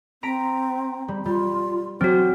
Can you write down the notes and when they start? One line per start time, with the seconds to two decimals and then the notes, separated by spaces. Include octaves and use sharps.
0.23 C4 A#5 B6 D7
1.08 G3
1.25 G3 F4
2.01 F#3 C4 F#4 C5